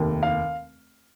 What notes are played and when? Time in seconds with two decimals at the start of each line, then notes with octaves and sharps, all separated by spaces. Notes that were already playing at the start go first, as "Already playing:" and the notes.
Already playing: F1 D#2 D#3
0.23 F5